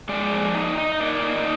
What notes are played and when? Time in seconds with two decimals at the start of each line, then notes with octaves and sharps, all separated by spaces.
0.09 G#3 D5
0.32 F3
0.55 D#4
0.78 D#4
0.92 D#5
1.00 A#3 D5
1.23 D#4